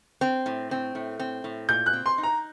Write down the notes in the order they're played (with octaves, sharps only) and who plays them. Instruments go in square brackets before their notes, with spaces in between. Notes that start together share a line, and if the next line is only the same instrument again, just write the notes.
[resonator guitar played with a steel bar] C4
A2
C4
A2
C4
A2
[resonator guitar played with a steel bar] A#2 [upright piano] G6
[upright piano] F#6
[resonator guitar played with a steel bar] C4
[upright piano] C6
[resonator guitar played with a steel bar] D#4
[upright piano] A#5